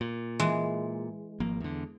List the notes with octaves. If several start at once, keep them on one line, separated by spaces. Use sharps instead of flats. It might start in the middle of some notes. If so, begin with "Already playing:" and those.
A#2
E3 G#3
G#1 F3 A#3
E2 D3